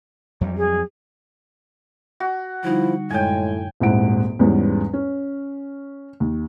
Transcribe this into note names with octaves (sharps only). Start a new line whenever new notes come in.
F2 F#3 G3
G#4
F#4
D3 F3 G3 D#4 E4
F#2 A2 G#3 C#5 G5 G#5
D#1 G#1 G#2 E4 F#5 D7
E2 G#2 G3 B3 C#4
C#4
D#2